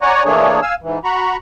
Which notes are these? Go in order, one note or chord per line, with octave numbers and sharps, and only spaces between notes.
C#5 D5 F#5 G#5 A#5 C#6
E3 A3 A#3 D4 G#4 C#5
F5 G#5 E6
G#2 E3
F#4 A#5 B5 C#6